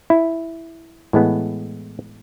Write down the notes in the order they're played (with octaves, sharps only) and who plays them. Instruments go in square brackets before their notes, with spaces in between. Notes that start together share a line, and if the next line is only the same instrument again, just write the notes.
[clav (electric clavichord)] E4
A2 E3 G#3 B3